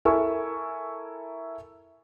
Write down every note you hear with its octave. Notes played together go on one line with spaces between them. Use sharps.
E4 A4 A#4 G#5 C#6 E6